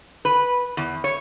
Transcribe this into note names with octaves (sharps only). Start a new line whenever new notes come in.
B4
E2
C#5